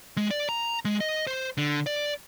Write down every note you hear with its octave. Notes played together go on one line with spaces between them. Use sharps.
G#3
D5
A#5
G#3
D#5
C5
D3
D5